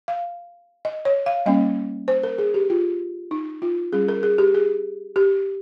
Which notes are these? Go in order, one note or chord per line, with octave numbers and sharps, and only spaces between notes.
F5
D#5
C#5
F5
G3 A#3 C#4 D#5
C5
A#4
G#4
G4
F4
D#4
F4
G3 C#4 G#4
A#4
G#4
G4
G#4
G4